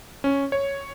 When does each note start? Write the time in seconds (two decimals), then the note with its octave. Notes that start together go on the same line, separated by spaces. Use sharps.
0.24 C#4
0.52 C#5